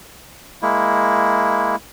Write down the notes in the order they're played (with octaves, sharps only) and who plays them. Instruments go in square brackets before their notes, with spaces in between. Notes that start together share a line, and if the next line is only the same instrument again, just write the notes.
[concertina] G#3 A#3 E4